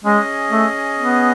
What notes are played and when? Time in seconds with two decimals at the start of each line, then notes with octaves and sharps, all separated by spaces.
0.05 G#3 C#4 G#4 D#5
0.51 A3
0.97 B3